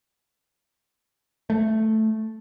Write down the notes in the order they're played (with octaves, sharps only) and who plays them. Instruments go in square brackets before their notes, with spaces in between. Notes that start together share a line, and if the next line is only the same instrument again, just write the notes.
[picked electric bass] A3